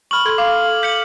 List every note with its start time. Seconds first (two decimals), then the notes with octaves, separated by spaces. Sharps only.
0.11 B5 C#6 F6 F#7
0.25 A4 C6 G#6
0.38 F5 D6
0.83 G6 B6 C#7 F#7